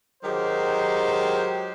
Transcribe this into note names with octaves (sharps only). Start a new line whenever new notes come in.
D#3 F#3 G#3 G4 C5